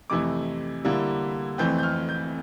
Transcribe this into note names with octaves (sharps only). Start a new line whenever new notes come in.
F2 C3 E3 A3 E4 D6
D3 G3 A#3 E4
F2 E3 A3 C4 G6
G6
F6
G6